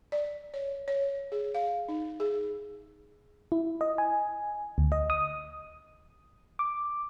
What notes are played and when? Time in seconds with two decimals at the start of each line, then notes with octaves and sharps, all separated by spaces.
0.12 D5
0.54 C#5
0.88 C#5
1.32 G#4
1.55 F5
1.89 D#4
2.20 G#4
3.52 E4
3.81 D#5
3.98 G#5
4.78 D2
4.92 D#5
5.10 D#6
6.59 D6